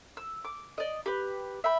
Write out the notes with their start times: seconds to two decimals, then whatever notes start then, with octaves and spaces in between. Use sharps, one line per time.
0.17 E6
0.45 D6
0.78 D5 D#5
1.06 G4 B4
1.64 E5 G5 B5